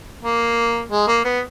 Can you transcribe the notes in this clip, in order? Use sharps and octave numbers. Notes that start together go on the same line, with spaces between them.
A#3
G#3
A#3
B3